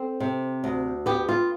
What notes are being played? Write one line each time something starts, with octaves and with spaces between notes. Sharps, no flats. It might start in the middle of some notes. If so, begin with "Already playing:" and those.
Already playing: C4 A4
C3
D2
B3 G4
F4